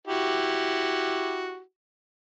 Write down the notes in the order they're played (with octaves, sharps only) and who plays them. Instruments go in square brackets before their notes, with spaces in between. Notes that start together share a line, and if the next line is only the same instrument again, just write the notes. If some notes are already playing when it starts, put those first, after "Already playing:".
[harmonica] E4 F#4 G4